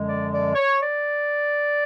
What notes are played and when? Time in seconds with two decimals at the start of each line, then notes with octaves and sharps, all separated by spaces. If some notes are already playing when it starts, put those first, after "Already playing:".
Already playing: F#2 D3 F3 G#3
0.09 D5
0.32 D5
0.55 C#5
0.80 D5